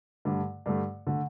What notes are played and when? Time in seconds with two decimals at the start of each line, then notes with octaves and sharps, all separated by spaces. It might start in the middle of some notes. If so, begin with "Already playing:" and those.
0.25 G2 D3 A3
0.66 G2 D3 A3
1.07 D3 A3